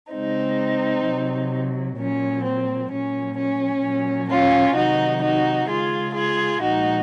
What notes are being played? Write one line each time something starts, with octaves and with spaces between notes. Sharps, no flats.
C#3 G#3 C4 D#4
C3 F#3
A#2 F#3 C#4
C4
A#2 F#3 C#4
C#4
A#2 F#3
C#4 F4
C3 D#3 F#3 D#4 F#4
D#4 F#4
C#3 G#3 F4 G#4
F4 G#4
A#2 F3 G#3 D#4 F#4